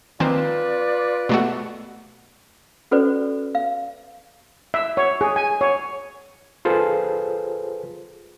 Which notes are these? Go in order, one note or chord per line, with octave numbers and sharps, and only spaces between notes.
D#3 A#3 C4 F4 B4 D5
B2 A3 F#4
C#4 F#4 A4 B4 C5 D5
F5
E5
C#5
G#4
G#5
C#5
F4 G#4 A4 B4 C5